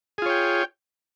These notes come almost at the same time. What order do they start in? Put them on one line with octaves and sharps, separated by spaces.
G#4 F4 C#5 G5